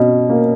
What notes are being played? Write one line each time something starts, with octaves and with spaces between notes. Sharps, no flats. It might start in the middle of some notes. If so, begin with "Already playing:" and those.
Already playing: B2 C#4
A#3